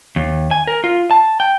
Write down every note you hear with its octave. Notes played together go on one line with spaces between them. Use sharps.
D#2
G#5
A#4
F4
A5
G5